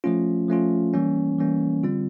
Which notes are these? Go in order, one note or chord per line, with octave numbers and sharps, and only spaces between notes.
F3 A3 C#4 F4
F3 A3 C#4 F4
E3 G3 A#3 C#4
E3 G3 A#3 C#4
D3 G3 C4 F4